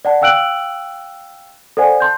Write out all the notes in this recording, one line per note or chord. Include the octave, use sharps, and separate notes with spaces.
D5 F#5 A5
F5 G5 E6 F#6 D7 F#7
A4 C5 D5 F#5 G#5
A5 C6 G6